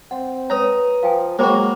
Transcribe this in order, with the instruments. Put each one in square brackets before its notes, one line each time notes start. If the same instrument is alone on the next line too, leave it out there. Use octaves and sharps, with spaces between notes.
[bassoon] C4 [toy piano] F#5
[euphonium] B4 [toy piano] C#5 [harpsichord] A#5 D#6
[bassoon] F3 [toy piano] F5 G5 G#5
[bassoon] F#3 [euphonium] G#3 [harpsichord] A#3 F#4 [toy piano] C5 G5 B5